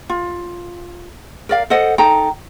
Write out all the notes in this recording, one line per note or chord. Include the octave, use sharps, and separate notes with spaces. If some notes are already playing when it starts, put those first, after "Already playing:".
F4
A#4 D5 F5
A4 C5 D#5 F#5
D#4 A4 G5 A#5